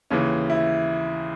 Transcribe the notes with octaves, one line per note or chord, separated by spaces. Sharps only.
D#2 C#3 E3 C#4
E4